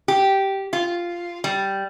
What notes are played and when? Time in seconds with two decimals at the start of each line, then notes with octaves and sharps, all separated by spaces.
0.08 G4
0.73 F4
1.44 G3